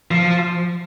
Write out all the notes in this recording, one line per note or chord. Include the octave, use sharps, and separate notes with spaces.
F3